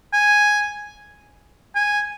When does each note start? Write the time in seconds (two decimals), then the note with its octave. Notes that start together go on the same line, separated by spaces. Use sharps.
0.13 G#5
1.76 G#5